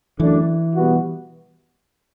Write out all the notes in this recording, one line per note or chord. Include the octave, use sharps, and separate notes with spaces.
F#2 D3 E3 A3 D4
B2 G3 B3 F#4